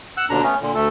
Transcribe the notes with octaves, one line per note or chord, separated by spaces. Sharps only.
F#5 E6 F#6
D#2 B2 D3 D4 A#5
A3 B3 C#4
A#2 D3
D2 A3 A4